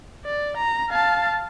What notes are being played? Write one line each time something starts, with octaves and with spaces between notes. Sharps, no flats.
D5
A#5
F5 A5